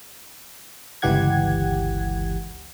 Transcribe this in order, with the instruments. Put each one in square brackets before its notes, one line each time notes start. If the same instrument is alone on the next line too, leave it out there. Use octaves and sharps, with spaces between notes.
[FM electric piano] G1 C#2 E3 G4 F#5 G#6